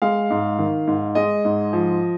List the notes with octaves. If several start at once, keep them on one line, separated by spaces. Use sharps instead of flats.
G#3 F5
G#2
D#3
G#2
G#3 D#5
G#2
F3